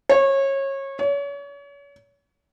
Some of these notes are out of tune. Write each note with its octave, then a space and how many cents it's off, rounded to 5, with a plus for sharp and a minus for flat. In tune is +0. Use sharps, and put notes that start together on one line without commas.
C#5 -25
C#5 +35